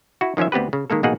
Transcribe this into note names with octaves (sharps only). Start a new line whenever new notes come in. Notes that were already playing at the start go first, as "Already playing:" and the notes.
E4 F#4
D#3 F3 C#4 F4 E5
D2 B3 C4 G4 B4
C#3
D#3 G#3 A#3 A4
A1 B2 A#3 D#4 G#4 F#5